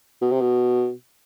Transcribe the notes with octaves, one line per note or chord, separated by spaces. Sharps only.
B2
C3
B2